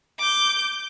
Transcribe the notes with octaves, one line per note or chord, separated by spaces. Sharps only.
D6 G6